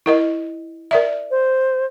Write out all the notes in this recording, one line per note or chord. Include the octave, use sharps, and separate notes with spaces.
E4 A#4 D#5
A#4 D5 E5
C5